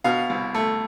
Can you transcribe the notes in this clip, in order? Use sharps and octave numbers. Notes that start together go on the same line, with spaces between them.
B2 F5
C2
A3